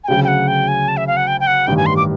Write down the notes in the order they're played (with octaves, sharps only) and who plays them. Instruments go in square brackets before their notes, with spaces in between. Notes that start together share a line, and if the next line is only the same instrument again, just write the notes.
[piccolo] G#5
[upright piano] D2 C#3 F#3 [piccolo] G5
[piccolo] G5
F#5
G5
G#5
A5
E5
F5
F#5
G5
G5
F#5
[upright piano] A1 G2 D#3 [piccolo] G5
[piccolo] G#5
C6
D6